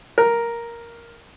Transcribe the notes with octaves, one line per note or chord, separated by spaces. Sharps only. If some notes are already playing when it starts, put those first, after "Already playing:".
A#4